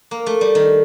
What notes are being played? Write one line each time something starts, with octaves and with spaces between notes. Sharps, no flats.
A#3
A3
G3
D#3